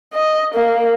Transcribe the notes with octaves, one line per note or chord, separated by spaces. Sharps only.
D#5
A#3